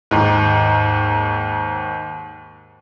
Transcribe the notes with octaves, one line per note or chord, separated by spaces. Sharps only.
D#2 G#2